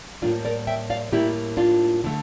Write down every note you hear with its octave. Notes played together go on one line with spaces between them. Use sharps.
A2 G3 A#3 D4 F4
A#4 D5
E5 G5
D5 F5
A2 G3 A#3 E4 G4
D4 F4
D3 A3